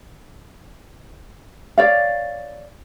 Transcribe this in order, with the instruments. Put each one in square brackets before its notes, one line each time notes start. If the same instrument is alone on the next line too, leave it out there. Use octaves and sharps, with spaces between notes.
[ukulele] C#5 D5 F5